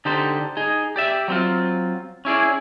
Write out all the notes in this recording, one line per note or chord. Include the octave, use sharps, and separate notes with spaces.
D3 D#4 G4 A4 C5
D#4 G#4
G4 D5 E5
F#3 C4 F4
C#4 E4 G#4 D5